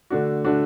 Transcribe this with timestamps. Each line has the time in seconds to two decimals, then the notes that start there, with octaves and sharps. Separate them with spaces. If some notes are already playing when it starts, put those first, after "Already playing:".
0.10 D3 A3 D4 F#4
0.45 D3 A3 D4 F#4